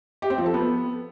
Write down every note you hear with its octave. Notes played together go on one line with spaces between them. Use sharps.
G4
C4
F3
A4
B3